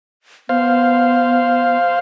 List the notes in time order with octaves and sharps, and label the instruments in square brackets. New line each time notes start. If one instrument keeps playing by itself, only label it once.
[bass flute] B3 [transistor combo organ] C5 F5